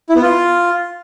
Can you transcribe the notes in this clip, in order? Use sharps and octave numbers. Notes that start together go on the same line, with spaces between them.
E4
B3
F4